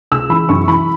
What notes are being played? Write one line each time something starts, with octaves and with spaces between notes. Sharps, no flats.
C#2 E6
E3 B5
F#2 C#6
E3 B5